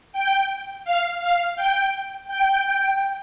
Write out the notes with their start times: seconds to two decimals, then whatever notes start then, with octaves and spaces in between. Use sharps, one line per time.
0.13 G5
0.85 F5
1.20 F5
1.56 G5
2.28 G5